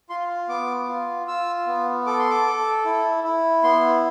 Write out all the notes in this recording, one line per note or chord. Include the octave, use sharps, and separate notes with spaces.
F4 C6
B3 D6
F4
F4 E6
B3
A4 D6
C6
D6
A4
E4
E4
B3 C6